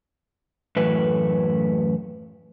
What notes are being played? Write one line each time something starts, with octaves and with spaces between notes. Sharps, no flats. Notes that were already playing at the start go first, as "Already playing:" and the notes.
F#2 A2 E3 A3 B4